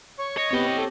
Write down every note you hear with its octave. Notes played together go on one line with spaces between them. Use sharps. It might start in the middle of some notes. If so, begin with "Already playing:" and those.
C#5 C#6
C#5 D#5
B3 C4 G4 C#5 G5
A4